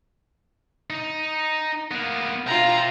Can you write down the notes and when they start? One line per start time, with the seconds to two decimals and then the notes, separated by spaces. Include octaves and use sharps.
0.90 D#4
1.91 A#3 B3
2.47 F4 E5 G5 A#5